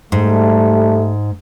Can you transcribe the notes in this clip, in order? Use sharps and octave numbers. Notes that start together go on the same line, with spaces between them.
G#2 G3 A3